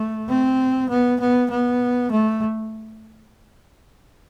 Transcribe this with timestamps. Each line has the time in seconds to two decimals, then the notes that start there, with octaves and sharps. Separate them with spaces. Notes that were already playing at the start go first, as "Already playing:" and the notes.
Already playing: A3
0.29 C4
0.89 B3
1.20 B3
1.51 B3
2.11 A3